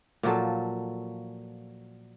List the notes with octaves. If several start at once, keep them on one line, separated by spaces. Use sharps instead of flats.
A#2 F3 F#3 A4